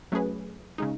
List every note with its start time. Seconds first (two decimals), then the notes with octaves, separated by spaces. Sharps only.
0.12 F#3 A3 C#4 G#4 B4
0.78 C#3 G#3 D#4